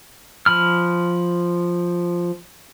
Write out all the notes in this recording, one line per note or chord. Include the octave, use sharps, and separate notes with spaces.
F3 B5 F6